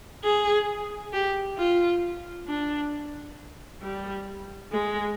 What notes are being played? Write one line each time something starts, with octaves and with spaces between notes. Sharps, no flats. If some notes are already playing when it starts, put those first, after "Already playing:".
G#4
G4
F4
D4
G3
G#3